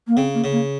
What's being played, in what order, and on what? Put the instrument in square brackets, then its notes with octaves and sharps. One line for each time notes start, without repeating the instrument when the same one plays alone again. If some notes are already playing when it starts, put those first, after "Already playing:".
[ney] A#3
[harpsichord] C#3 [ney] C4
[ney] A#3
[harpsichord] C#3
[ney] A#3